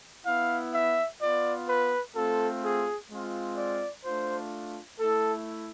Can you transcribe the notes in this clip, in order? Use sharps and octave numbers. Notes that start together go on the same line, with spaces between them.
B3 E4 F5
E5
B3 F4 D5
B4
A3 C4 F4 A4
G#4
G#3 C4 F4
D5
A3 D4 F4 C5
A3 E4 A4